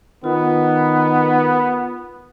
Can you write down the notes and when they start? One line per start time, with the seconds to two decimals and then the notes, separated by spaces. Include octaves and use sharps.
0.24 D#3 B3 F4